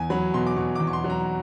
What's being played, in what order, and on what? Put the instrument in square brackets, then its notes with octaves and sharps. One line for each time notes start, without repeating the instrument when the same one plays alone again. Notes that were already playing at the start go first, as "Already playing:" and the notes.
Already playing: [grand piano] E2 G#5
F#3 B5
B2 C6
D6
B2 C#6
E2 D6
C#6
C6
F#3
A#5